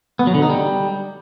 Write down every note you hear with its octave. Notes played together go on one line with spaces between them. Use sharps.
B3
F#3
D3
D#4
G3